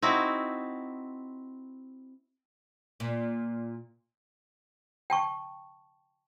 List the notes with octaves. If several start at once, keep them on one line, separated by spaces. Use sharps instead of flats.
C4 D#4 E4 F#4
A#2
G5 A5 C#6